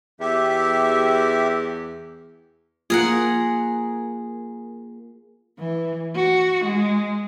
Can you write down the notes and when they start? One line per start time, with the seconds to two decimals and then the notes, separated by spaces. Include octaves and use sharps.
0.20 E2 G4 E5
2.90 A#3 F4 G#4 A#4 F#5
5.59 E3
6.15 F#4
6.65 G#3